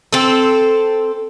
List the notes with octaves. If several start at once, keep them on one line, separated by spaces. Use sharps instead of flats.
C4 A4